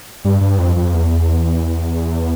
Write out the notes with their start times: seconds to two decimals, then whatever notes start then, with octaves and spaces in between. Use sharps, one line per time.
0.25 G2
0.41 G2
0.59 F2
0.76 F2
0.94 E2